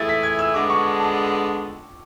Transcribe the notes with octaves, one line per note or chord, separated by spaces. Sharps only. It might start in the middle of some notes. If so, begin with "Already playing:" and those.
Already playing: E3 A3 E4 G#4 A6
B6
G#6
E6
D3 G#3 B3 D4 D6
C#6
A5